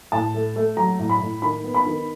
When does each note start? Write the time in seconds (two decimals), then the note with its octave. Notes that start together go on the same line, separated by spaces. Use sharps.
0.12 A2 A5
0.34 A3
0.56 A3
0.77 F#3 A#5
0.99 A2
1.09 B5
1.21 A2
1.42 D#3 B5
1.64 B3
1.74 B5
1.86 D#3